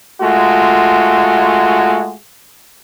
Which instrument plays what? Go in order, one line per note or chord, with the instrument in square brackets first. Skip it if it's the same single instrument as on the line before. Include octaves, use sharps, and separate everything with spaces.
[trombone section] G#3 A3 F4 F#4